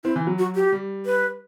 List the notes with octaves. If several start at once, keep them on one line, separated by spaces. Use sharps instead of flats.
C4 E4
E3
F#3
F#4
G4
G3
B4